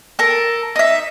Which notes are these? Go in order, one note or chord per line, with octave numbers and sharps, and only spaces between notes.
A4 A#4
D#4 E5